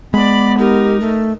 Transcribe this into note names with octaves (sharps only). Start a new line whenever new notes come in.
G#3 B3 D5 B5
D#4 G4 A#4
A3